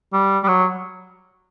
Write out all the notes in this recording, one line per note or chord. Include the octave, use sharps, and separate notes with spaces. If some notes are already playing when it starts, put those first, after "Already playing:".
G3
G3
F#3